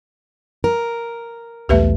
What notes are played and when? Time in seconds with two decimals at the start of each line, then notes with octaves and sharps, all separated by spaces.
0.64 A#4
1.69 B1 E2 A3 G4 B4 E5